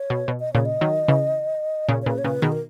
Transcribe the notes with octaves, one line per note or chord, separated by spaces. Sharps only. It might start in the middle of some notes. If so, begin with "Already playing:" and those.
Already playing: C#5
B2
B2
D#5
A#2 C#3 C#5
D#5
D#3 F#3
C#3 E3
A#2 C#3 C#5
C#5
A#2 C#3 B4
C#5
A#2 C#3 B4
B2 D#3 G#4
A#4